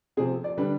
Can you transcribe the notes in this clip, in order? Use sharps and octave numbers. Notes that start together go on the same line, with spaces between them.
C3 F3 C4 G#4
D5
D3 G3 D4 B4